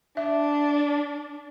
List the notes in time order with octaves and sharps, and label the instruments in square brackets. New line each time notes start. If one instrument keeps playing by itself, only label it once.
[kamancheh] D4 [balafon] E5